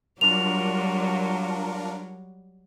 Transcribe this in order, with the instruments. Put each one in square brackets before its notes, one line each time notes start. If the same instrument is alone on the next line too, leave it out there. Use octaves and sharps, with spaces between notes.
[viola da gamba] F#3 G3 [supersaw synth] D4 F4 A#4 [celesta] F7